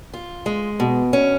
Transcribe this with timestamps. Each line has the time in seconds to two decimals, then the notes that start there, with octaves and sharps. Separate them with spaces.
0.13 F4
0.46 G#3
0.80 B2
1.13 C#4